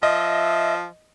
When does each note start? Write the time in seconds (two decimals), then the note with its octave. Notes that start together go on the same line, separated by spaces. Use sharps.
0.03 F3 D#5 E5